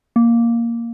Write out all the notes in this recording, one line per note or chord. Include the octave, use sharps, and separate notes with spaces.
A#3